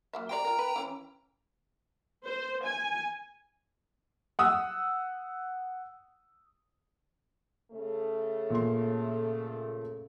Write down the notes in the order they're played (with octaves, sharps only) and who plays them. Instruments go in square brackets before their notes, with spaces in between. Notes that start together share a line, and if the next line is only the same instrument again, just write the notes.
[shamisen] F#3 A#3 E5
[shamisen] G4 C5 D5 [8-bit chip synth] G5 A#5
[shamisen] F4 A#4
B4
E3 C#4
[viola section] C5
G#5
[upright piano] F#5 D#6 E6
[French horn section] C#3 A3
[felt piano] A#2 C6